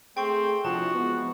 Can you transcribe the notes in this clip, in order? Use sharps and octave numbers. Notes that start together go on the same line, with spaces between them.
A3 C4 G#4 G5 C#6
F3 C4 D4 E4 F#4 A5
E2 G#3 B3